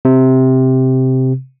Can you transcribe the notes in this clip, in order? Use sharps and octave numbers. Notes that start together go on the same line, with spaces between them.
C3